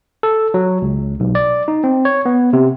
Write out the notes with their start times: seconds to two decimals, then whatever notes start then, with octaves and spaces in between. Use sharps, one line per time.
0.23 A4
0.54 F#3
0.82 C#2
1.20 B1
1.35 D5
1.68 D#4
1.84 C4
2.05 C#5
2.26 B3
2.53 C3